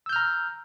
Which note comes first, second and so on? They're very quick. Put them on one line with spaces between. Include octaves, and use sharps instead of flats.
E6 G6 F6 A#5